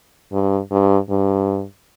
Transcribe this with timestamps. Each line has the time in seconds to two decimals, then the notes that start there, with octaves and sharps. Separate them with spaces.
0.33 G2
0.71 G2
1.10 G2